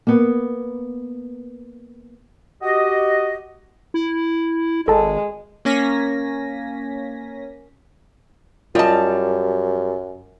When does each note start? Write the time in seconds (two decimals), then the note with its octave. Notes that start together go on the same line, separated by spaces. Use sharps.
0.07 A#3 B3
2.62 F#4 G4 D#5
3.94 E4
4.88 G#1 G#3 A4 A5
5.65 A#3 C#4 G#5 A#6 B6
8.75 F#2 G3 F4 D#5 A5